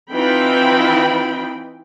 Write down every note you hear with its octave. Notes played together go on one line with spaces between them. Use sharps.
E3 C4 D#4 F4 G5 B5